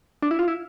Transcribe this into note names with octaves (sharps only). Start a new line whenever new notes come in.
D4
E4
F4
E4